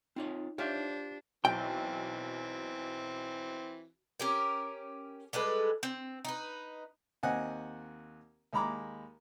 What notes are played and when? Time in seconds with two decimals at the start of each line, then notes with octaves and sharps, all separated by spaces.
0.16 C4 D#4 F4 C#5
0.58 D4 F4 G4 C5 C#5 E5
1.45 B1 E3 C4 G5
4.20 C#4 G4 A#4
5.33 G3 G#3 A4 B4
5.83 C4
6.25 D#4 B4
7.23 D#2 C4 D#5 F#5 G#5
8.53 D#2 G#3 A#5 B5 D6